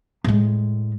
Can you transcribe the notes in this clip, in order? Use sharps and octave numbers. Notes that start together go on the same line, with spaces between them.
A2 G#3